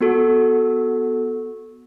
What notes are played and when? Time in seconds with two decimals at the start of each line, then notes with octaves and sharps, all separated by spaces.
0.01 B3 F#4 A4